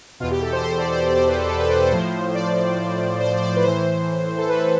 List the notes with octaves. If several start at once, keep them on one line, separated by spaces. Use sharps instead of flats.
E2 B2 F4
G4
A4
C5
C5
D5
C5
D5
C5
B4
A4
A4
B4
C5
C5
A2 F3
D5
C5
C5
D5
B4
A2 E3 C5
A4
B4